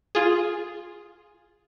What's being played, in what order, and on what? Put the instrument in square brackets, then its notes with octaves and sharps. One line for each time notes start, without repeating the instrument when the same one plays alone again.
[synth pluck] F4 G#4